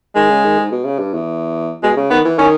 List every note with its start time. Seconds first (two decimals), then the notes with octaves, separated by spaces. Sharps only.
0.15 D#3 G#3
0.30 C#3
0.44 D#3
0.58 G#2
0.72 B2
0.85 C#3
0.99 G2
1.14 E2
1.83 B2 G#3
1.97 C#3
2.10 D#3 B3
2.25 E3
2.39 D#3 C#4